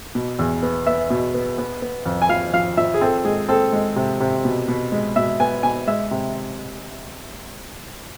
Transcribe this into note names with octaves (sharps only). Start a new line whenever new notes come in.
B2
E2
B3
B3 E5
B2
B3
B3
B3
F2
G#5
F3 F5
F3 F5
F3 E5
G#4
C4 A4
G#3 G#4
C4 A4
G#3
C3
C3
B2
B2
G#3
B2 E5
B3 G#5
B2 G#5
G#3 E5
C3